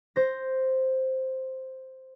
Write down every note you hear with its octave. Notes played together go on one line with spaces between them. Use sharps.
C5 A#6